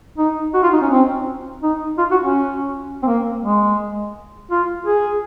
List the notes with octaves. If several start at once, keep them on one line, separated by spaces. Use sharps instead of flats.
D#4
F#4
F4
D#4
C#4
C4
D#4
F4
F#4
C#4
C4
A#3
G#3
F4
G#4